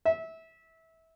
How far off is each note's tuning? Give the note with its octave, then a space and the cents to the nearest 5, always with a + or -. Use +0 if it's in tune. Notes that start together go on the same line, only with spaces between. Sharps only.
E5 -20